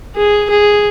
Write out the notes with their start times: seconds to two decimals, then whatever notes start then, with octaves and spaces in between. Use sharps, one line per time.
0.16 G#4
0.50 G#4